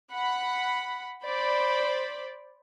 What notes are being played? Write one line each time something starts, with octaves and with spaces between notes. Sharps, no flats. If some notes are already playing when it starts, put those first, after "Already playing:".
F#5 B5
C5 D5 B5